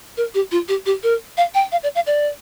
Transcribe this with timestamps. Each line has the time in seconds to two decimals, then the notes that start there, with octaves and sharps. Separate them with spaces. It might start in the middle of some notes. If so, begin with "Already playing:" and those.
0.17 A#4
0.34 G4
0.51 F4
0.68 G4
0.86 G4
1.03 A#4
1.37 F5
1.54 G5
1.72 F5
1.83 D5
1.95 F5
2.07 D5